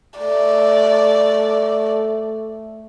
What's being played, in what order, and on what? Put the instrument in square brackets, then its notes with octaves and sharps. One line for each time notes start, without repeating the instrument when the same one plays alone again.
[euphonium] A3 [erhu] D5